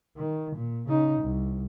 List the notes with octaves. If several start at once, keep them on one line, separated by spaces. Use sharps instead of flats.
D#3
A#2
C#3 D#4
C2